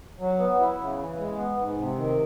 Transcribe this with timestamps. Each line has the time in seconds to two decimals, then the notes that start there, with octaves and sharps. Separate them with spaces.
0.20 F#3
0.38 B3
0.59 E4
0.78 C#3
0.98 E3
1.18 G#3
1.37 B3
1.57 G#2
1.77 C3
1.96 D#3